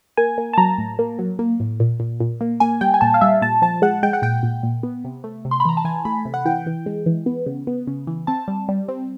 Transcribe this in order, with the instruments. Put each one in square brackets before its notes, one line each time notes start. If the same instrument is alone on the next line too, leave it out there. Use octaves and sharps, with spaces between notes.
[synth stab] A#3 G#5
A#3
A5
F#3 A#5
A2
A#3
F#3
A#3
A2
A#2
A#2
A#2
A#3
A#3 G#5
G3 G5
G#5
A#2 A5
F5
G3 E5
A#2 A5
F3 A5
G#3 F#5
G#3 G5
F#5
A#2 G5
A#2
A#2
B3
C3
A3
C3
C6
B5
E3 A#5
A5
E3 G#5
A3 B5
C3
F#5
E3 G5
E3
G#3
E3
B3
C#3
B3
C#3
E3
C4 A5
G3
G3
C4